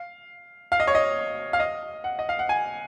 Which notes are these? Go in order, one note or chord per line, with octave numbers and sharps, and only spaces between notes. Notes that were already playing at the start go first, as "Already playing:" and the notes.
Already playing: F5
F5
D#5
C#5
D#5
F5
D#5
F#5
D#5
F5
F#5
G#5